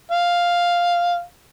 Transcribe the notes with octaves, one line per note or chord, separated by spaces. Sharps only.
F5